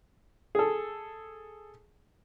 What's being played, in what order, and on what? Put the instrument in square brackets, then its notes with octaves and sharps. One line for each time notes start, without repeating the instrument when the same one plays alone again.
[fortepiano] G#4 A4